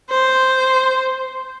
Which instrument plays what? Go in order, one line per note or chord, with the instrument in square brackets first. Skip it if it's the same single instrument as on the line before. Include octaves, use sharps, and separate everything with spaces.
[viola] C5